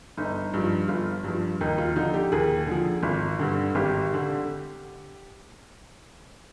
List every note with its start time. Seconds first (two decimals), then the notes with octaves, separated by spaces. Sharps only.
0.17 G1 D#4
0.54 G2 F3
0.88 G1 F4
1.24 G2 F3
1.61 D#2 D#4
1.78 F4
1.96 D3 F3 D#4
2.14 G4
2.32 D#2 G#4
2.67 D3 F3
3.03 G#1
3.39 G2 D3
3.75 G#1 G4
4.14 D3